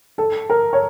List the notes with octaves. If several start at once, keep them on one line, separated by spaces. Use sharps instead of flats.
A4
A#4
C#5